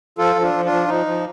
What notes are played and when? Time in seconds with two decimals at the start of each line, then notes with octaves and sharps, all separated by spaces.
0.18 F3 F4 A4
0.36 F3
0.42 D4 F4
0.53 F3
0.65 D4 F4
0.72 F3
0.88 F3 D#4
1.06 F3